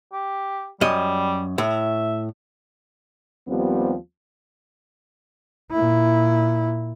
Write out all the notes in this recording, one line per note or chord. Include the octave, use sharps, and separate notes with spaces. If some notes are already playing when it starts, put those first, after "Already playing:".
G4
F#2 G3 D#5
A2 E5
D#2 F3 G3 B3 C4
A#2 E4